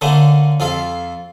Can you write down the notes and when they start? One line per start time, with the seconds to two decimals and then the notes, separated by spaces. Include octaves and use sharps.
0.01 D3 A3 A#3 C#4
0.60 F2 F4 A4 F5